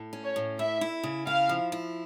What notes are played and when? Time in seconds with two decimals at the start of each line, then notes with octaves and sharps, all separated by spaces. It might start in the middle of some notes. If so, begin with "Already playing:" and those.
Already playing: A2
0.13 C#4
0.24 C#5
0.36 A2
0.59 E4 E5
0.81 E4
1.03 C#3
1.26 E4 F5
1.49 F3
1.72 E4